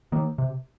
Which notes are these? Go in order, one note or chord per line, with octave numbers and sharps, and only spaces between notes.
D#3 A#3
C3